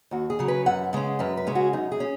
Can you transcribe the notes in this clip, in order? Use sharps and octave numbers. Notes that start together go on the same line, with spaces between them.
D#2 F#4
G#4
C#3 F#3
B4
F#2 F#5
C#3 G#3 C#4
F#2 B4
B4
C#3 G#3 C#4
F#4
F#2 D#4
G#4
C#4